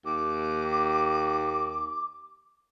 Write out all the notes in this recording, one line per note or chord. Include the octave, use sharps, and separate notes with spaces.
D#2 D6